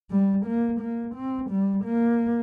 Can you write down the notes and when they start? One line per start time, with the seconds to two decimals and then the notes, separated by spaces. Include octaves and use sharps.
0.10 G3
0.45 A#3
0.80 A#3
1.15 C4
1.50 G3
1.85 A#3